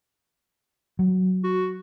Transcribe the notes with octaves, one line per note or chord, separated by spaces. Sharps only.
F#3
F#4